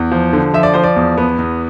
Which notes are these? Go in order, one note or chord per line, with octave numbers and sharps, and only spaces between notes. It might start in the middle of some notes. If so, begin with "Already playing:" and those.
Already playing: E2
F3
D3
F3 E5
D5
F3 C5
D5
E2
B3
E2